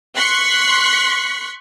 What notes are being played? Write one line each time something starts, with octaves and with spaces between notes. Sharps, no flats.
C6 C#6 F#6 B6 C#7